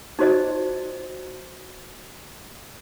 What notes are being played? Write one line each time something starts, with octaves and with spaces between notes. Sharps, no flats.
D#4 F4 F#4 C5 D5 D#5